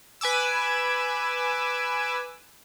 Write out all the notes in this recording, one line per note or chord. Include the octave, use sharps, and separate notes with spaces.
B4 G#5 D6 E6